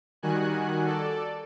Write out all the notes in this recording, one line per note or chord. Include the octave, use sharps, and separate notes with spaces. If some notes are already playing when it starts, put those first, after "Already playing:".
D#3 G3 F#4 G#5 F#6
A4 D5